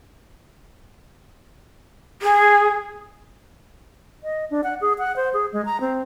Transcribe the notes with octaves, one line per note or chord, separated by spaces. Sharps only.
G#4
D#5
D4
F#5
G#4
F#5
C5
G#4
G#3
A#5
C4